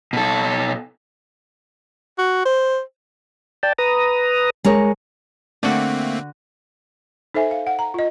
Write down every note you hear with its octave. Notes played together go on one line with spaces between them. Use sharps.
B2 A4
F#4
C5
D5 G5 A5
B4 A#5 D#6
G#3 A#4 C#5
D3 A3 A#3 C4 F#4
D#4 A4 C5 E5 G#5
F5
F#5
A#5
F4 D#5